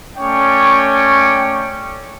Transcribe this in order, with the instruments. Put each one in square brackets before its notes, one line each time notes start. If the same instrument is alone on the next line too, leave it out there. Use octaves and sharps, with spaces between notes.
[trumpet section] A3 C#4 C#5 D5 G5